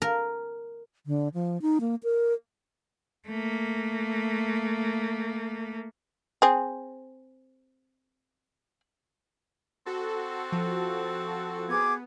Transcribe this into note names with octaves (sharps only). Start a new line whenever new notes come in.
A#4
D3
F3
D#4
A#3
A#4
A3 A#3
C4 G#4
C4 F#4 A4
F3
B3 G#4 D6 G#6